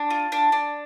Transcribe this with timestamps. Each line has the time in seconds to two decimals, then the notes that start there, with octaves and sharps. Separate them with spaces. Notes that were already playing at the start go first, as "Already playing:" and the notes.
Already playing: D4
0.10 F4
0.32 D4
0.52 D4